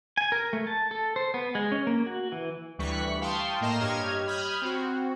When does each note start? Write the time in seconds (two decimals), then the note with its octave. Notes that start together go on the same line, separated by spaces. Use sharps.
0.17 G#5
0.32 A#4
0.53 A3
0.67 A5
0.91 A4
1.16 C5
1.34 B3
1.55 G#3
1.72 C#4
1.87 A#3
2.07 F#4
2.32 E3
2.78 D2 E3 G3 C#6 F#6 B6
3.21 F5 G5 A5 C6 C#6 D#6
3.60 A2 A#3 D#5 A#5 C6 E7
3.80 G2 G4 C#5 D#5 F6 G#6
4.27 B5 D#6 F6 G6 G#6
4.62 C4 F#4